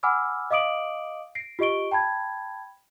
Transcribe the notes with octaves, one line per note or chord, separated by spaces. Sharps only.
F#5 G#5 B5 D6 E6 F6
D#5 F5 D6 D#6 D7 F#7
A#6 C7 D7
F4 G4 D#5 C#6 D7 G7
G5 A5 B5 G#6